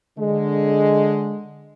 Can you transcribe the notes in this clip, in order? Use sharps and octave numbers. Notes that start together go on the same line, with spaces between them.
D3 G#3